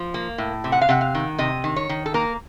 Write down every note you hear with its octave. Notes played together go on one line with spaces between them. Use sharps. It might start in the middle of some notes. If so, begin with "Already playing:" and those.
Already playing: F3
A#3
A2
C3
F#5
F5
C3 F#5
F5
D#3
C3 D#5
D#3
C#5
D#3
A4
A#3 A#4